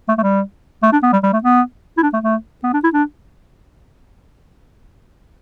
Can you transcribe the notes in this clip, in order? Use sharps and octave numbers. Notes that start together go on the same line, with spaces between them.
A3
A3
G3
A3
D4
B3
G3
G3
A3
B3
E4
D4
A3
A3
B3
D4
E4
D4